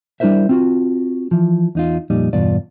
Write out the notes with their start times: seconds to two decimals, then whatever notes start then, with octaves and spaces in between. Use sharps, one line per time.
0.20 G3 D4 E4 A#4 C5 E5
0.49 C4 F4 F#4
1.31 E3 F3
1.75 E2 D#4 F4
2.10 F2 A#2 G3 D#4
2.33 E2 G2 B2 F4 D5